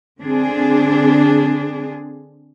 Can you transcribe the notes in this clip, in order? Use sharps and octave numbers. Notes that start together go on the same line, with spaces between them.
D3 C4 D4 G#4